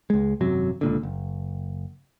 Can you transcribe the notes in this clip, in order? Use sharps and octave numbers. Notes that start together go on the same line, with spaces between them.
C#2 G#3
G#1 F#2 C3 F#3
C#2 A#2 D3
F#1